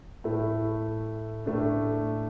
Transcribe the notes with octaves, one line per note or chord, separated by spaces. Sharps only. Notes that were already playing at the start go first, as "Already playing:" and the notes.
A2 A3 E4
A2 A3 D4